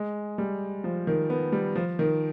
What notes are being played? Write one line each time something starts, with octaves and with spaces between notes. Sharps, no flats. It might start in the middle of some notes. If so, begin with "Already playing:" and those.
Already playing: G#3
G3
F3
D#3
B3
G3
F3
D#3